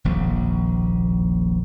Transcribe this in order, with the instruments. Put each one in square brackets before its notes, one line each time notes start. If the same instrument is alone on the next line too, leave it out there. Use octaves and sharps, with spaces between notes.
[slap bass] D#1 A#1 F2